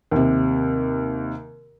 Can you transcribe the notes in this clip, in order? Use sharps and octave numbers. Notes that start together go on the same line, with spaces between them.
D#2 C3